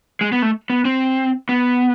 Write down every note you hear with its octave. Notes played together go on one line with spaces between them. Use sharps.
G#3
B3
A3
B3
C4
B3